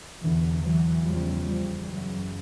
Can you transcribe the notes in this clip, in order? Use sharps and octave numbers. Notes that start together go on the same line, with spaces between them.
E2 B2 D3 E3
E3 F#3
E2 C#3 F3 G3
F3 G3
F#2 C#3 E3 F#3